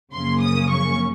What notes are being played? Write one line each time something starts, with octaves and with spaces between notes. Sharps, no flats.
F#2 C#3 F3 A#3 C#4 C6
D#6
C#6